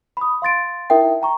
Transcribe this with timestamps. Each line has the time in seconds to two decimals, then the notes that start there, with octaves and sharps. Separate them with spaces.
0.17 B5 D#6
0.42 F5 C6 A6 D7
0.90 D#4 E4 A#4 E5 G5
1.22 G5 A#5 C#6